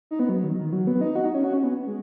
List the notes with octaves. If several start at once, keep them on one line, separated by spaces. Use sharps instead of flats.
D#4
B3
F#3
D#3
D#3
F#3
B3
D#4
F#4
D#4
C#4
F#4
C#4
B3
G#3